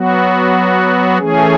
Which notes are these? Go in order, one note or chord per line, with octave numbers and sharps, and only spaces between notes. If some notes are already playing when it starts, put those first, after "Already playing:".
Already playing: F#3 B3 F#4
E3 A3 C#4 G#4